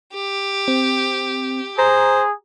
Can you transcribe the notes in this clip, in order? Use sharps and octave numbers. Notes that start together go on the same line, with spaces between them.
G4
C4
G#4 C5 A#5